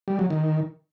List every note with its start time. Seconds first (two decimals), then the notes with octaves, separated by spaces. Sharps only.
0.08 G3
0.19 F#3
0.30 D#3